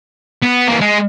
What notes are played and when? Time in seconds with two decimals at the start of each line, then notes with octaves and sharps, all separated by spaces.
0.43 B3
0.68 E3 A#3
0.81 G#3